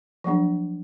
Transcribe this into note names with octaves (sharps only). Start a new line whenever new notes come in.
F3 F#3 A#3 D4